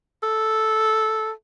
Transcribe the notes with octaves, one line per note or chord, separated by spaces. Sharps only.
A4